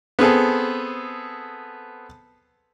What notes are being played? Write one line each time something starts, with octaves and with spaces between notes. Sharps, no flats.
B3 C4 G#4 A4